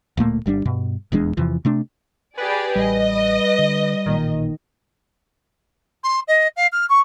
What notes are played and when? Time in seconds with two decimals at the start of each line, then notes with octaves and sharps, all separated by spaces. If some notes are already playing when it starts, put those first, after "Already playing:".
0.17 D1 A#2 A3 A#3
0.46 G1 G3 C4 D4
0.65 G2 B2
1.12 D#1 E2 G#3 D4
1.37 E2 C3 E3 F3
1.65 C3 A3 D4
2.37 G4 G#4 B4 D5
2.76 A1 G3 D#5
3.59 D3
4.06 A1 A#2 D#3
6.03 C6
6.27 D#5
6.56 F5
6.72 F6
6.89 C#6